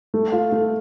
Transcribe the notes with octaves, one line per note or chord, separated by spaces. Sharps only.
A3
F4
A3